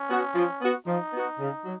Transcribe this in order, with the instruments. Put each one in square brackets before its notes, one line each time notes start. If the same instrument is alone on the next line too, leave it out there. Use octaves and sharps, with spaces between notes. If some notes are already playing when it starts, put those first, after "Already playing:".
Already playing: [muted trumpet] C#4
[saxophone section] B3 F#4
F3
B3 F#4
[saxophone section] F3 [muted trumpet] D#4
[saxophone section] B3 F#4
C#3
F#3